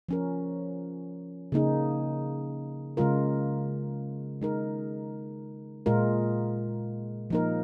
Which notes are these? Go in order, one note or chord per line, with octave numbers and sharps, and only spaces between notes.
F3 C#4 A#4
C#3 A#3 D#4 G#4
C#3 G#3 F4 A#4
G#3 D#4 A#4
A#2 G#3 F4 A#4
F3 A#3 D#4 A#4